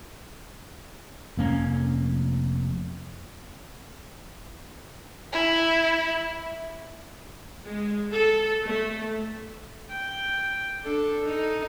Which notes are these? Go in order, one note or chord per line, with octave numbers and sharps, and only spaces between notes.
F1 A#3 C#4
E4
G#3
A4
A3
G5
D4 A4
D#4 A4